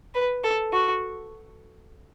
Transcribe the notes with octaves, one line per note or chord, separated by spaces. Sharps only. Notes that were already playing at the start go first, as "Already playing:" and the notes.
B4
A4
F#4